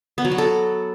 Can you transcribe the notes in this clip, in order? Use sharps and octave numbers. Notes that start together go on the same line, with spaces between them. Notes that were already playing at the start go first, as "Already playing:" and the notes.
B3
F#3
F#4
A4